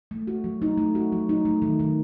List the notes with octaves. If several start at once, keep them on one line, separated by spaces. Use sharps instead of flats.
A3
F#4
F#3
D#4
A3
F#4
F#3
D#4
A3
D#3
D#3